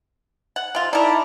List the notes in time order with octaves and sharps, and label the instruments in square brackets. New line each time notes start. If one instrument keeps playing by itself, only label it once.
[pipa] F#5
C3 F4
[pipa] D#4 A#4 [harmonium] E4 D5 A5